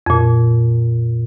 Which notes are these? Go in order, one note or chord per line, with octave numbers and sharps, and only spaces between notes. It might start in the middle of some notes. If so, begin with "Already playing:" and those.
F2 A#2